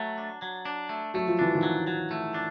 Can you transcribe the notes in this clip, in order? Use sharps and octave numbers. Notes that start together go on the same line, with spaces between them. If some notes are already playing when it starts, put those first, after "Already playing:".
Already playing: F#3 A3
D4
F#3
D4
A3
F#3 A3
F3
E3 D4
D#3 F3
F#3
F#3
A3
D4